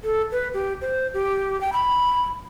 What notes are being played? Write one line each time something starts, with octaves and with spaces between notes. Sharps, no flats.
A4
B4
G4
C5
G4
G5
B5